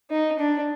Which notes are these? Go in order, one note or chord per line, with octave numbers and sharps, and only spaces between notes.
D#4
D4